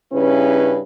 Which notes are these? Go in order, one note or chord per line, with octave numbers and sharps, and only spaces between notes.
G2 C#3 C#4 E4 B4